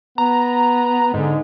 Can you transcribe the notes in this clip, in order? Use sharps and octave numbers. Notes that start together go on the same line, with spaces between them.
B3 A#5
G#2 D3